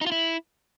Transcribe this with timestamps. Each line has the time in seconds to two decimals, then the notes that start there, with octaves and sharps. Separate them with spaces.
0.01 D#4
0.06 F4
0.12 E4